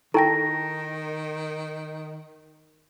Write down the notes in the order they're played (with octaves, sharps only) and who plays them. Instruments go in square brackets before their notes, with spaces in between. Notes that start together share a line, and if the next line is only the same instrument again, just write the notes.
[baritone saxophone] D#3 [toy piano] D#4 E4 C#6 [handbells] A4 G5 [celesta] A#5 A#6